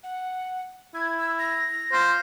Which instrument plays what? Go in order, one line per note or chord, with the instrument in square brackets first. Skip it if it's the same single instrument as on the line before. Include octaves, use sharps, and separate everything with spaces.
[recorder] F#5
[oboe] E4 [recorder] G#6
[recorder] E6
A#6
[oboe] F4 [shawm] C5